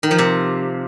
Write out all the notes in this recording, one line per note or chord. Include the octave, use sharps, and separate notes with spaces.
D#3
F3
C3